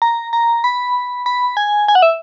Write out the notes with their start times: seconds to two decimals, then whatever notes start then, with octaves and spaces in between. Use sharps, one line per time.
0.02 A#5
0.33 A#5
0.64 B5
1.26 B5
1.57 G#5
1.88 G#5
1.95 F#5
2.02 E5